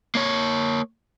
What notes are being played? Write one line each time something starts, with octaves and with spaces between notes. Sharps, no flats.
A#3 C#5